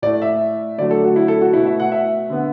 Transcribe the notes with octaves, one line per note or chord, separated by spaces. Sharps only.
A2 A3 D5
E5
D3 F#3 A3 D5
A4
F#4
E4
A4
F#4
B2 A3 E4
E5
F#5
E5
D3 B3